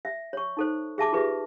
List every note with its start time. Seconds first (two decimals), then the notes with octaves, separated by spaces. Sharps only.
0.05 E5
0.33 C#5 C#6
0.57 D#4 A4 C5
0.98 G#4 E5 A5 D6
1.12 F4 G4 G#4 B4 E5